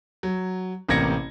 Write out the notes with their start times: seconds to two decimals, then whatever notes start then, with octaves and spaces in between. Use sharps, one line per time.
0.23 F#3
0.89 A1 C3 A#3 G#6 A#6 C#7